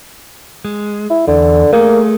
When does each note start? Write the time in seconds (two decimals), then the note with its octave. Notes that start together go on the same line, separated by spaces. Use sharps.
0.65 G#3
1.10 E4
1.27 E2 D3
1.73 A3 A#3 G#4 A4